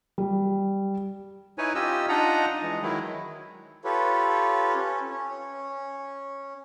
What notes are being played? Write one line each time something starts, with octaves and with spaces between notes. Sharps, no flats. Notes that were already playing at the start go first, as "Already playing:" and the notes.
G3
D#4 E4 B4 C#5 G#5
C#4 F4 G4 D#5 E6
D4 D#4 F4 D#5 F#5 A#5
E3 G#3
D#3 F#3 G#3 E4
F4 G4 A4 B4 C#5
C#4
C#4